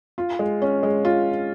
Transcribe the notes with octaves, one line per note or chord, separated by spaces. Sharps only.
F4
G#3
C#4
G#3
F4